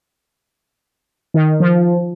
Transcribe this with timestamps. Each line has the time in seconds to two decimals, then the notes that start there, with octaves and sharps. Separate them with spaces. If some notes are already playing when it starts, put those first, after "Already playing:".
1.34 D#3
1.60 F3